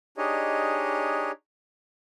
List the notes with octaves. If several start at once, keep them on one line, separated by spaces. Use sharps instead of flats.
D4 D#4 G4 G#4 C#5 D#5